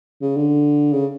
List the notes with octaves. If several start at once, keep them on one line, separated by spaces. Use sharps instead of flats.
C#3
D3
C#3